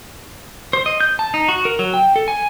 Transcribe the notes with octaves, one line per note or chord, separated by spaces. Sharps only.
C5
D#5
G6
A5
D#4
F#4
A#4
F#3
G5
A4
G#5